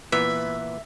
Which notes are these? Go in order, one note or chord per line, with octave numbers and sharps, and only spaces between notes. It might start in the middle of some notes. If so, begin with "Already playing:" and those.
A#2 E3 B3 B4 E5